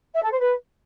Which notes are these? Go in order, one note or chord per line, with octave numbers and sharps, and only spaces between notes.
E5
A4
C5
B4